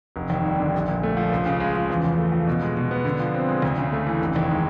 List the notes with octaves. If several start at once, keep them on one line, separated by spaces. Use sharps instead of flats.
F1
D#2
G3
D3
A#1
A#2
A3
F3
C#2
C#3
G#3
F3
E2
C#3
A3
F3
B2
G#3
B2
B3
D3
F3
C4
G#3
D2
C#3
A3
E3
F1
D#2
G#3